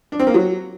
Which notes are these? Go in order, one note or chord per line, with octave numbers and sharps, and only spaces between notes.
D4
C4
A#3
F#3